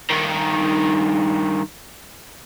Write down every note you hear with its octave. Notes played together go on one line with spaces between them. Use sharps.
G2 D#3